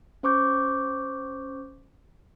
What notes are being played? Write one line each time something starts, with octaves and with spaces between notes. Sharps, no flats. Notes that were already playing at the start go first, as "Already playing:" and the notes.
C#4 C5 C#6 D6 G6